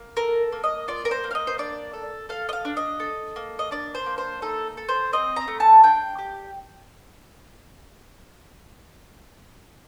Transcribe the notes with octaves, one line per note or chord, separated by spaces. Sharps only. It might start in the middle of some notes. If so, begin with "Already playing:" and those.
Already playing: A#3
A4 A#4
A#3
D#5
F4 D5
A#4
C5
A#3
F5
D#5
C5
D4 D5
A4
A4 F5
D#5
F5
D4
D#5
A4
A#3
D#5
D4 D5
C5
A#3
C5
D#4 A4
A4
C5
C4 D#5
A#5
A3
A5
D4 G5
G4